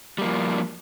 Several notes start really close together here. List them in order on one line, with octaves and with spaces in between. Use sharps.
G3 A#3 F3